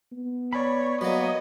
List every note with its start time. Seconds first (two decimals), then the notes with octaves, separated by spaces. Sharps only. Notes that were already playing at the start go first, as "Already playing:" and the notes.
0.12 B3
0.53 C#5 D5 B5
1.01 F#3 A#3 B3 D#5